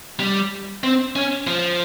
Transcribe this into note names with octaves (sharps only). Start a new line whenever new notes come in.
G3
C4
C#4
F3